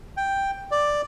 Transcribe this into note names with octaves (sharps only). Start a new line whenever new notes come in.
G5
D5